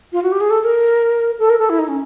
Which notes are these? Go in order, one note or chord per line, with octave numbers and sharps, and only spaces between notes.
F4
F#4
G4
G#4
A4
A#4
A4
A#4
A4
E4
D#4
C#4